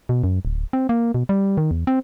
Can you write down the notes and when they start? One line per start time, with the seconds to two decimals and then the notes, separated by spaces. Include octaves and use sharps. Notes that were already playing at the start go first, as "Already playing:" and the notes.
0.09 B2
0.24 F#2
0.45 D1
0.73 C4
0.89 A#3
1.14 B2
1.29 G3
1.57 D#3
1.71 E2
1.87 C4